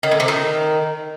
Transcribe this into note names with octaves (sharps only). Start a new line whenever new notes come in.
D#3
A2
C3
D#3